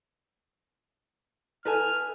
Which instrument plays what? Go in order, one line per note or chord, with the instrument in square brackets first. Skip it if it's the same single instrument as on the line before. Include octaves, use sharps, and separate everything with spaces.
[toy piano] E4 A4 A5 [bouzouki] B4 E5 G#5 [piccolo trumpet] F6